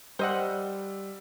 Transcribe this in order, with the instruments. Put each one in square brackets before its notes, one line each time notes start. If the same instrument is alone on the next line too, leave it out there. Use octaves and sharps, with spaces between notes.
[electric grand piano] G3 E6 [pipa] C5 D#5 F#5